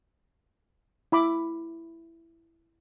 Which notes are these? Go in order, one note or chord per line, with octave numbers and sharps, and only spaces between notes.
E4 B5 D6